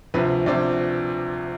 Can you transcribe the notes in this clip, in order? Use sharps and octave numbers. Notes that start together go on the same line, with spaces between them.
D2 C3 F3 C4 B4
D2 C3 F3 C4 D5